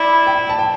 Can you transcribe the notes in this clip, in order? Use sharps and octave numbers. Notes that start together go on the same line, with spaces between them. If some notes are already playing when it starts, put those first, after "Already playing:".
Already playing: E4 D5
G5
A5
G5